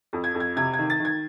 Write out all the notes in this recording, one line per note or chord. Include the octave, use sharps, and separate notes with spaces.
F2
G#6
F2
G#6
C3 G#6
G#6
D#3
A6
D#3 G#6